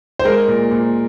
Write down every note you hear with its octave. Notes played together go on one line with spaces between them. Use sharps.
C5
G#3 A#4
A#2
A#2